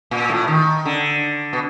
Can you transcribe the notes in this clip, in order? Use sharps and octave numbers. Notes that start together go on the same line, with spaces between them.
A#2
A2
D#3
D3
B2